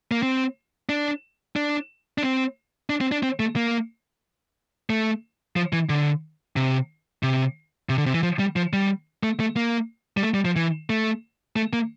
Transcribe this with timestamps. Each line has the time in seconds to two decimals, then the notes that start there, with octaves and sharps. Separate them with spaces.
0.11 A#3
0.23 C4
0.89 D4
1.56 D4
2.18 D4
2.23 C4
2.90 D4
3.01 C4
3.12 D4
3.23 C4
3.40 A3
3.56 A#3
4.90 A3
5.56 F3
5.73 E3
5.89 D3
6.56 C3
7.23 C3
7.89 C3
7.98 D3
8.06 C3
8.14 E3
8.23 F3
8.39 G3
8.56 F3
8.73 G3
9.23 A3
9.40 A3
9.56 A#3
10.17 G3
10.23 A3
10.34 G3
10.45 F3
10.56 E3
10.90 A3
11.56 A3
11.73 A#3